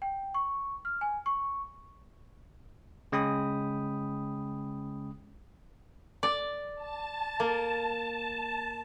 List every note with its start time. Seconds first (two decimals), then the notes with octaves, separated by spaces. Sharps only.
0.02 G5
0.34 C#6
0.85 F6
1.01 G#5
1.26 C#6
3.12 C#3 G#3 C#4 G5 B5 D#6
6.23 D5
6.75 A5
7.40 A#3 A5